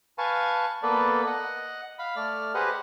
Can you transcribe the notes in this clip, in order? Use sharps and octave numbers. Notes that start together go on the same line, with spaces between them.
B4 F5 G#5 A5 C#6
A#3 B3 A4 B4 D5
D#5 F#5
F5 B5
A3 D5 F6
G4 G#4 B4 C5 D#5 F#5